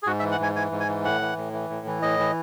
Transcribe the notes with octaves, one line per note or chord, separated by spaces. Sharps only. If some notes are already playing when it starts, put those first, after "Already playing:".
G#4
G#2 F#4
E5
E3
F#5
G#2 G#5
E3 G#5
G#2
G#5
E3
A2 F#5
E3
A2
E3
A2
E3
A2 D#5
E3